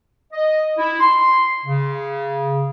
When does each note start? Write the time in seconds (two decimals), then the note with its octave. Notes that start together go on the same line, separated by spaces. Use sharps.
0.33 D#5
0.78 E4
1.00 C6
1.66 C#3